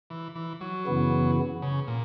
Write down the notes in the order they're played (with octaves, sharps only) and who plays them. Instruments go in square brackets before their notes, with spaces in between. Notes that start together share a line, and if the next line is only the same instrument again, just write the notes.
[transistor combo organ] E3
E3
F#3
[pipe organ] F#2 C#3 E3 B3 E4
[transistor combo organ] C#3
A#2